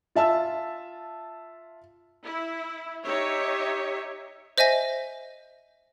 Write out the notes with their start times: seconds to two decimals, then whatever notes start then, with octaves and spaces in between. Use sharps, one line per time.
0.15 F4 E5 A5 E6
2.24 E4
3.04 D#4 G4 C#5 E5
4.58 C5 D#5 E5 G#5 A#6